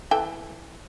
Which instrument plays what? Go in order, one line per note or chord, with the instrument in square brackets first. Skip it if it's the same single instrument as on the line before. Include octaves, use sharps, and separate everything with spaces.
[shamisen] E3 A4 G5